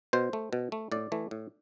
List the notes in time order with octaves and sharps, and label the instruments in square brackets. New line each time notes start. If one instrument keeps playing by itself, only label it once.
[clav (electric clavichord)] B2 C5
A3
B2
A3
A2 D5
E3 A3
A2